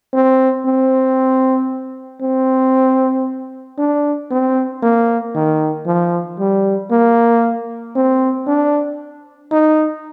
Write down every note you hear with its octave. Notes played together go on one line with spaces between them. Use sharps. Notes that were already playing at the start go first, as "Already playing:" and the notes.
C4
C4
C4
D4
C4
A#3
D#3
F3
G3
A#3
C4
D4
D#4